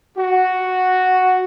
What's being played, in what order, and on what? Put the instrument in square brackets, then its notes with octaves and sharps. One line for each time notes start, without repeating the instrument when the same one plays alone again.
[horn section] F#4